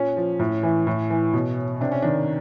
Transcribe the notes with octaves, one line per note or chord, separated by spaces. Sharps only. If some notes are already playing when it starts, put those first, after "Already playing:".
Already playing: A#2 C#4
F3
A2
E3
A2
E3
B2
C3 D4
C#4
D#3 D4